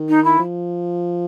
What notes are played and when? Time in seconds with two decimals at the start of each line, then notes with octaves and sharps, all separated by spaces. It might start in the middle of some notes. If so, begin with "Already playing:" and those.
Already playing: D#3
0.09 D#4
0.24 E4
0.39 F3